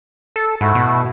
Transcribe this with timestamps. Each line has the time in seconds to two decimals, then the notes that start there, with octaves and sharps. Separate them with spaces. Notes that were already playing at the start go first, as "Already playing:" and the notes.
0.36 A4
0.61 G#2 A3 E4 F#4
0.75 B2